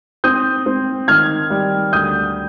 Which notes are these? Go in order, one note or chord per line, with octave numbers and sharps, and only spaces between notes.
C4 D#6 G6
C4
D#3 F6 G#6
G3
D2 D#6 G6